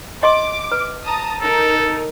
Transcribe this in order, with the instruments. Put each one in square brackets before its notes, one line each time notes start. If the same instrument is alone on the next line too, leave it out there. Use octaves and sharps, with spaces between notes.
[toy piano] D#5 C6 [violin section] D6
[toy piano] B4
[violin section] A5 A#5 D#6
[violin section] D#4 A#4 [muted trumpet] A4